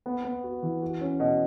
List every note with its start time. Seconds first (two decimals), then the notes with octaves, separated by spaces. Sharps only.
0.06 B3
0.24 B3
0.44 F#4
0.63 E3
0.82 F#4
1.01 C#4
1.20 B2